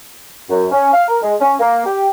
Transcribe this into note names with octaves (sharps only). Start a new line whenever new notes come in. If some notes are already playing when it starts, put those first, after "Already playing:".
F#2
C#4
F5
A#4
G#3
C#4
A#3
G4